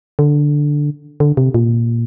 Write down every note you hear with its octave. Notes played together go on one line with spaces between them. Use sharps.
D3
D3
C3
A#2